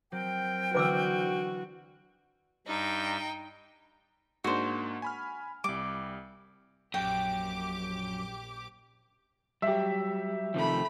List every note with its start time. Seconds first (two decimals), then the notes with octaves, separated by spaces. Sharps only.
0.12 F#3 C4 A#4 G5
0.74 D3 E3 B3 F#4 B4 D6 E6
2.67 G2 D#4 G5
4.44 G#2 A#3 D4 F#4 C5
5.02 G#5 B5 F6
5.64 C2 G3 D6
6.94 A#1 F#2 G4 G5 D6
9.62 F#3 G3 G4 E5
10.54 C3 D#3 F3 A3 B5